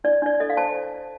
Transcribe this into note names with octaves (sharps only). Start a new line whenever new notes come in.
D4 D5
D4 D5
A4 D#5
F5
C5 A5